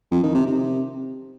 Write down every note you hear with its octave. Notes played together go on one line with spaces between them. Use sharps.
F2
D#3
C3
C3